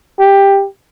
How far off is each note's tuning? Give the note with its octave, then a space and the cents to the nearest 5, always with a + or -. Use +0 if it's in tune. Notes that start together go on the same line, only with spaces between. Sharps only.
G4 +10